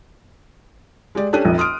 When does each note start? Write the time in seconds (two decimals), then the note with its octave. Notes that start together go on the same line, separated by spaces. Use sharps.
1.15 G#3 G4 D5
1.33 C#4 D4 G4 A4 F#6 D#7
1.45 F1 A#1 F2
1.58 C6 D#6 F6 D7